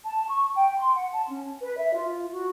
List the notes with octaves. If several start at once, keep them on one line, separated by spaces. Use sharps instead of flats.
A5
C#6
G5
C6
F#5
A5
C#4
B4
E5
F4
F#4